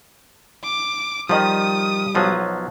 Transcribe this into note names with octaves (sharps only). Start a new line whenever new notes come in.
D6
D#3 F3 G3 D#5 D#6
B1 F3 F#3